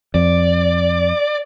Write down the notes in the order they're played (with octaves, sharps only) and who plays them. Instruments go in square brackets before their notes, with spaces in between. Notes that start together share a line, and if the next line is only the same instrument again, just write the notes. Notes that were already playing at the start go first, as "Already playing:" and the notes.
[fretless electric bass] F2 [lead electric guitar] D5